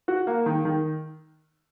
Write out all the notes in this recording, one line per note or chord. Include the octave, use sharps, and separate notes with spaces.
F#4
A#3
D#3
D#3